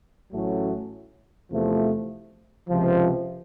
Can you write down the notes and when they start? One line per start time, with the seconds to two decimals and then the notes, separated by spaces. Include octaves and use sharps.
0.31 A1 A2 F#3 A3 C#4
1.50 E2 C3 F3 A3
2.69 C#2 C3 F3